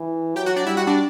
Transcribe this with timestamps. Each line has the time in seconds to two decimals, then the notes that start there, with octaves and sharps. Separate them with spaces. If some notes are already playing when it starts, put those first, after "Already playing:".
Already playing: E3
0.36 F#3 G4 G5
0.46 F#4 F#5
0.56 D4 D5
0.66 G3 E4 E5
0.77 F#4 F#5
0.87 D4 D5